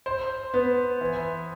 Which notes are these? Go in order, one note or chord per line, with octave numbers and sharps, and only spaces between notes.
C5
B3
E3